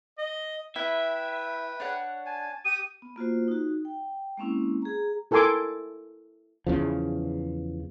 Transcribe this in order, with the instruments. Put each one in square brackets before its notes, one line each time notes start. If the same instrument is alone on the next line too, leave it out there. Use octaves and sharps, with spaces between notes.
[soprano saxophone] D#5
[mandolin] E4 [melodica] B4 G5 [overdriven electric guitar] E5
[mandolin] D4 C#5 F#5
[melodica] G#5 A5
[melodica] G4 D#6 [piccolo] D#7
[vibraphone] B3
A#3 F4 F#4 C5
D#4 F#4
G5
G#3 A#3 C4 C#4 E4
G#4 A#5
[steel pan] E4 A4 A#4 G#5 C6 D6
[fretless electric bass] E2 C#3 F3